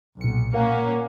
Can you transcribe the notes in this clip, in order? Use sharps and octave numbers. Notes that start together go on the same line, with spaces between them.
B1 A#2 C#7
A#2 A#3 C#4 A#4 F5 F#5